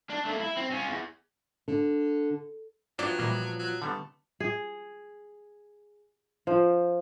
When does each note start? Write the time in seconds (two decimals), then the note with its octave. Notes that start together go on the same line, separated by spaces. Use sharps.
0.10 D4
0.25 A3 A#3
0.40 E4
0.57 C4
0.71 C#4 F4
0.88 E2
1.68 D3
2.99 F3 F#3 B3 D4 E4 C5 D5
3.19 A#2 E3 G3 A#3 C5
3.59 F#3
3.82 D3 G3 A3 B3
4.40 G#4
6.47 F3